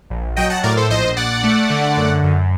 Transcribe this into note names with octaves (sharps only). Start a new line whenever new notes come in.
A#1
F#3 D#5 G5
F#5 A5
A2 A#4 D5
A4 C5
A#1 C5 D#5
A#1 D5 F#5
A3
D3
F#2
F#2